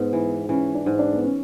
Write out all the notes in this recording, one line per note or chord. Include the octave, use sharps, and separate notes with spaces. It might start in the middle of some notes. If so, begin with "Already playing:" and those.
Already playing: G#2 B3
E3
E3 C#4
D4
G#2
D4
B3
C#4